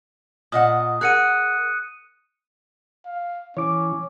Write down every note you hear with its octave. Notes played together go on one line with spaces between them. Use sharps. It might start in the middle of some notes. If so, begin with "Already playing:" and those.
A#2 D#5 F#5 D#6
G#4 A#4 F#5 F#6 C#7 D#7
F5
E3 C#4 C#5 D6